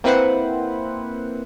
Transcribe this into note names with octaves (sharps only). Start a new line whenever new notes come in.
A#3 C4 E4 B4 C5 F#5